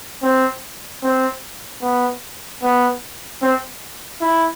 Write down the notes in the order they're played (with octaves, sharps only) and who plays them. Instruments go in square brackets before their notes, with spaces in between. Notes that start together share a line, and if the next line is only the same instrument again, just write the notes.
[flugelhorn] C4
C4
B3
B3
C4
E4